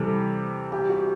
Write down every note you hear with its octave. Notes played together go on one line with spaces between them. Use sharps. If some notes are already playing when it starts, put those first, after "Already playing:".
Already playing: C3 E3 G3 A4
G4
F#4